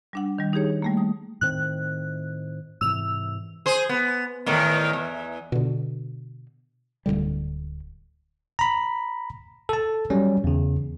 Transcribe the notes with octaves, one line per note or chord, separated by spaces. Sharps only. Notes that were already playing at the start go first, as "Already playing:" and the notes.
G3 D4 F#5
D#3 G3
D#4 G4 G#4 C#5
G3 A3 A#3
D#6
A2 D#3 C4 F#6
G#2 C3 E3 E6 F7
G#4 C5
B3
E2 A2 D#3
E2
B2 D3
D1 D#2 D3 G3
A#5 B5
A4 A5
F#3 G3 C#4
E2 C#3